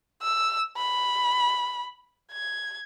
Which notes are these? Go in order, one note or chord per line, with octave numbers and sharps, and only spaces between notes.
E6
B5
G#6